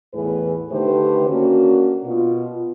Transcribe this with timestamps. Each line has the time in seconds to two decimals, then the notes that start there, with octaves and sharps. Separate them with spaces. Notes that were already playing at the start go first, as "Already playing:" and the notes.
0.13 E2 A2 E3 B3 G#4 B4
0.70 D3 D#3 A3 G4 B4 C5
1.28 A#3 C#4 D4 F#4
2.05 B2 F4